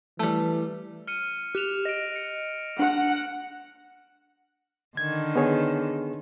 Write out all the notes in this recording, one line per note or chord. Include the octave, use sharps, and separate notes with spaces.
E3 G3 A3
F6 C#7 D#7
G4 F#6 E7 F7
D#5 A#6 D7
C#7
D4 F#5
D3 D#3 G#6
B3 G#4 C#5